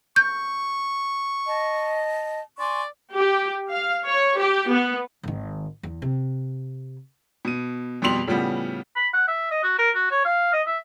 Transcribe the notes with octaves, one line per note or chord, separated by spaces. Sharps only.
C#6 G6
D#5 A5
D5 G#5 C6 C#6
G4
F5
C#5
G4
B3
G#1 D#3
E2
C3
B2 D#7
F2 B2 G3 C6 F7 F#7
A2 C#3 F3 G3 B3
B5
F#5
E5
D#5
F#4
A#4
F#4
C#5
F5
D#5
E5